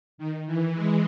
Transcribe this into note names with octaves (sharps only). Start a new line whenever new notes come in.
D#3
E3
G#3